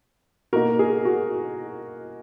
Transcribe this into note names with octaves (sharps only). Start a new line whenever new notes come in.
B2 A#3 D#4 F#4 A#4
G#4
F#4